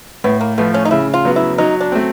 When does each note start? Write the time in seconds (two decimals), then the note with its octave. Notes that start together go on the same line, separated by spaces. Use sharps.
0.24 A2 B3
0.41 A#3
0.58 F3 A3 B3
0.74 C#4
0.85 D#4
0.91 C#3 E4
1.14 F4
1.25 F#3 B3
1.36 E4
1.58 F#3 D#4
1.80 D4
1.92 A3 C4